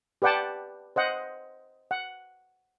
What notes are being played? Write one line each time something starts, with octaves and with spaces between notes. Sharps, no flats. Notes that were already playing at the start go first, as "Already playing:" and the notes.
G4 B4 D5 F#5 G5 A5
C5 D#5 F#5
F#5